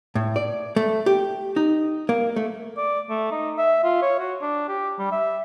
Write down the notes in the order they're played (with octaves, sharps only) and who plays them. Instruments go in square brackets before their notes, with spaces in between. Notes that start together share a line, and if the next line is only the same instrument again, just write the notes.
[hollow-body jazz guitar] A2
D5
A3
G4
D#4
A#3
A3
[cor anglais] D5
A3
D#4
E5
F4
C#5
F#4
D4
G4
G3
E5